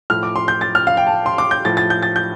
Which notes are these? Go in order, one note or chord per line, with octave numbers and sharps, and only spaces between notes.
A2 F3 F6
D6
C6
G6
A6
F6
F5
G5
A5
C6
D6
G6
A2 F3 A6
A6
G6
A6
G6